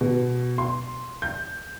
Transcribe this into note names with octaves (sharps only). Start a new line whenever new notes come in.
B2
C6
G6